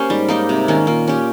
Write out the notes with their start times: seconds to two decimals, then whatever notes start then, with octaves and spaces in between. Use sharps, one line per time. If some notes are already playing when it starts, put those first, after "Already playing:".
Already playing: A#3 C#4 G4 C5
0.09 G#2 G3
0.28 A#3 D#4 G4
0.49 C3
0.68 D#3 A#3 C#4
0.87 A#2 A#3
1.07 C#4 G4